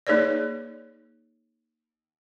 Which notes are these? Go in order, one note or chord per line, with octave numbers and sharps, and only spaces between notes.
A#3 D#4 G#4 B4 C#5 D5